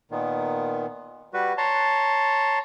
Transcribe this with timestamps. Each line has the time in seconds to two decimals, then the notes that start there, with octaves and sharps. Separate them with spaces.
0.11 A#2 D#3 B3
1.34 G3 F#4 B4
1.58 C#5 A5 A#5 C6